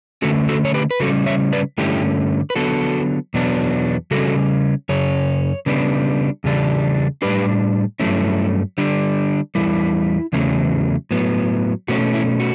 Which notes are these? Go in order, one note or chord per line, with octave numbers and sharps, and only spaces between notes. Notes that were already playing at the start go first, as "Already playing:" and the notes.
D3 A3 C#4 F#4 A4
F#4 A4
C#5
G4 B4
B4
C#3 G3 C#4 F#4 A4
C#5 E5
B4 D5
G2 D3 A3 C#4 E4 G4
B4
D3 F#3 B3 F#4 A4
E2 B2 F#3 B3 D4
C#3 G3 C#4 F#4 A4
F#2 C#3 C#5
C#3 G3 B3 D4
E2 C#3 G3 D4
A2 G3 D4 G4 B4
G2 F#3 A3 C#4 E4
D3 G3 D4
E2 C#3 G3 E4
E2 C#3 F#3 A3 C#4
A2 F#3 B3
B2 A3 C#4 F#4
E4
F#4